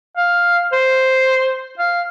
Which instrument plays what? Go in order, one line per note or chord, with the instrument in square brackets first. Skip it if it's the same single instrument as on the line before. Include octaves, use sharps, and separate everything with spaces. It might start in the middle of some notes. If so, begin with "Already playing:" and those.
[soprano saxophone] F5
C5
F5